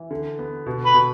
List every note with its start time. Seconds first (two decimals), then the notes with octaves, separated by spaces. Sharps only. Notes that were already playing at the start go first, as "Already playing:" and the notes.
Already playing: E3
0.11 D3
0.39 B3
0.66 B2
0.85 B4
0.94 B2